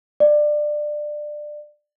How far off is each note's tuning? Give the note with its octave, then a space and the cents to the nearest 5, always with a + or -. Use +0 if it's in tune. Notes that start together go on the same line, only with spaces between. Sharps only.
D5 +20